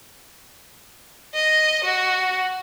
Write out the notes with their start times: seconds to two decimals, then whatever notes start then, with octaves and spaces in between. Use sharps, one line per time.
1.34 D#5
1.84 F#4